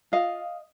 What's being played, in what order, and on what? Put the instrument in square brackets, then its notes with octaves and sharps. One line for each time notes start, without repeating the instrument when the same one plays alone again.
[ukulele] F4 D#5 F5